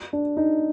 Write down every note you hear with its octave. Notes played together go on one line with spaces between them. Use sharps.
D4
D#4